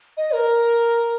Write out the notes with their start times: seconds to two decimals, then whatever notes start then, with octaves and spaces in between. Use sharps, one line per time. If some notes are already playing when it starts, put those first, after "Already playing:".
0.17 D#5
0.34 A#4